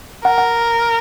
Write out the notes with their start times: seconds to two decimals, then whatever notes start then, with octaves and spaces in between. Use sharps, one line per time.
0.25 A#4 F#5
0.38 F#5